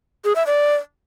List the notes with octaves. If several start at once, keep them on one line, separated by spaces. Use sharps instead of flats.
G#4
E5
D5